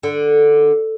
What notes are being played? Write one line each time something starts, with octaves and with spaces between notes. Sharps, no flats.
D3